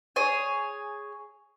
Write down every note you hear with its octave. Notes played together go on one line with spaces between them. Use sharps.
G#4 C#5 G#5